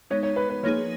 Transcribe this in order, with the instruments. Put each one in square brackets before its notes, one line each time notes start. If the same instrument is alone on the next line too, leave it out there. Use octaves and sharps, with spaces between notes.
[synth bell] G#3 B3 D#4 [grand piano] C#5
[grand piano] C#5
B4
B4
[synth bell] F3 A#3 D#4 G#4 [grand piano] C#5